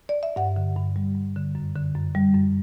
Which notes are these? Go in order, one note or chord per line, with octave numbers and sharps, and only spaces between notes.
D5
E5
G2 F#5
D3
G2
G3
G2
D3
F#2
D3
F#2
G3
F#2